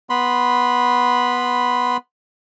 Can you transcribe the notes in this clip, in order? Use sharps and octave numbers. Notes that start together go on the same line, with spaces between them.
B3 B5 C6